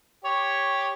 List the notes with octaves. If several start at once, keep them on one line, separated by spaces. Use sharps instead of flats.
G4 C#5